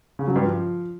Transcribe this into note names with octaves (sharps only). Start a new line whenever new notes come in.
C#3
F#3
G2
F3